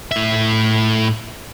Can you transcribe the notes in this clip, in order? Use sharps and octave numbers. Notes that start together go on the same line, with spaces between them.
A2 E5